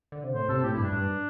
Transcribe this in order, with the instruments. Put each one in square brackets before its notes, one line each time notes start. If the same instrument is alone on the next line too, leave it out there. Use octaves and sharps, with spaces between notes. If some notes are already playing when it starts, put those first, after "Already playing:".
[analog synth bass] D3
C3
[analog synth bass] A2 [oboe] C5
[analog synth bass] C3 [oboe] A4
[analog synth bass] A2 [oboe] G4
[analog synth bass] G2 [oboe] E4
[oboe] D4
[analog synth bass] G2